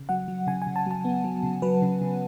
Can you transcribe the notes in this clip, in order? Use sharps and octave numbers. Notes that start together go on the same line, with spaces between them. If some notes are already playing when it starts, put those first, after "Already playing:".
Already playing: C#3
F#3 F#5
F#3
C#3 G#5
G#5
C#3
A5
F#3 A5
B3
F#3
C#3
F#3 B4
C#3
C#3